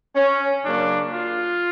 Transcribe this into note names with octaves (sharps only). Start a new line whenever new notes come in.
C#4
C#3 F#3 A#3 D4
F4